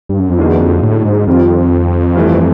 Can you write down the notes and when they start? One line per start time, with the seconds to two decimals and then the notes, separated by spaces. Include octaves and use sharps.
0.09 G2
0.19 F#2
0.29 F2
0.38 E2 D3 F#3 A#3 D#4 G#4
0.60 F2
0.83 A2
1.05 G#2
1.27 F2 D#3 G3 C4 F4
2.15 G2 E3 A3